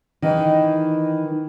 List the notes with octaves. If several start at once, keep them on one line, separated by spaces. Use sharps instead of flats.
D#3 E3 D#4